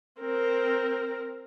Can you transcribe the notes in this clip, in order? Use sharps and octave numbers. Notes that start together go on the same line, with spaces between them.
C4 A#4